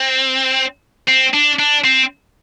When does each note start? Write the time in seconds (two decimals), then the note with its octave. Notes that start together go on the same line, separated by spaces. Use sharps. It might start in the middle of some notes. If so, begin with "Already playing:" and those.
Already playing: C4
1.09 C4
1.34 D4
1.59 D4
1.84 C4